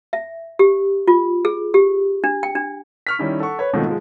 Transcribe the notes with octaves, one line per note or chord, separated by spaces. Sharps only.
E5
G4
F4
G#4
G4
D4
G5
D4
C#6 F6 B6
D#3 G3 C#4 E4
A4 F#5 C#6
B4 C#5
G#2 B2 D#3 F3 A3 C4
F3 G#3